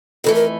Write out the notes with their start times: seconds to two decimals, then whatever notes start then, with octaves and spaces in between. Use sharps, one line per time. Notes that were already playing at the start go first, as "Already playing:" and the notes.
0.24 F2 E3 A3 A4
0.35 A#4